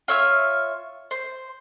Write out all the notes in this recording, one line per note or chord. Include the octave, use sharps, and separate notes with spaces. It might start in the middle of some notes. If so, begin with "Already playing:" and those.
F4 C#5 E5 F6
C5